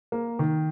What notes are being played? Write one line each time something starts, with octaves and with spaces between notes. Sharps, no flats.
A#3
D#3